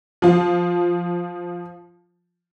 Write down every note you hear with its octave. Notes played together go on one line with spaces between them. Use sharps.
F3 F4